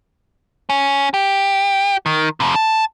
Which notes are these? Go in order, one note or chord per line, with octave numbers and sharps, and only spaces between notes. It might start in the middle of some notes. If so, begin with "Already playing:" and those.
C#4
G4
D#3
F2 C3
A5